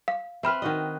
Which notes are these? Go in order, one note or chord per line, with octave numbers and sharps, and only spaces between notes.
F5
C4 B4 E5 B5 F6
D#3 F#4 D#5